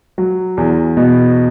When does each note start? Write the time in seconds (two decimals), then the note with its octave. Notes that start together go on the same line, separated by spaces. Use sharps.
0.18 F#3
0.57 E2
0.97 B2